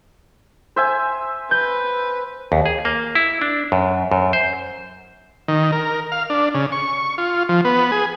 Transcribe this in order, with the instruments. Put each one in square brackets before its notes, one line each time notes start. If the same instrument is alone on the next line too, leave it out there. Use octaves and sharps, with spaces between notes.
[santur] C5 E5 G#5
[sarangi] B4 [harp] G6
[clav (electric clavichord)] D#2
G#4
A#3
E4
D4
F#2
F#2
C5
[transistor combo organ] D#3
A#4
F5
D4
C#3
C#6
F4
F3
B3
G#4